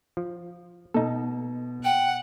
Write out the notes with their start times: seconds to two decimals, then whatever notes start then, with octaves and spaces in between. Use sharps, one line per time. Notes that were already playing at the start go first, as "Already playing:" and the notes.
0.17 F3
0.94 B2 D#4 A4
1.84 F#5 G5